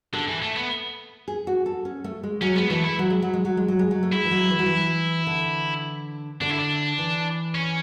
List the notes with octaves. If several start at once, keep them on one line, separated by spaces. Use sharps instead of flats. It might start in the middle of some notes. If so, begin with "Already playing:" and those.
D3 A4
E3
A3
B3
G#4
F#4
A4
C#4
A3
G#3
F#3 C#4
G#3 B3
E3 A3
E4
F#3
G#3
F#3
G#3
F#3
G#3
F#3
G#3
F#3
A3
G#3 E4
E3
F#3
E3
F#3
E3
D3
D3 D4
E4
D4
E3
C#4